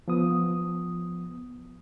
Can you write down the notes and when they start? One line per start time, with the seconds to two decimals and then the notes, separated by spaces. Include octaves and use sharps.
0.08 F3 B3 D#6